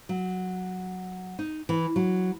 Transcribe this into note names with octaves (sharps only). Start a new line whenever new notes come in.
F#3
D#4
E3
F#3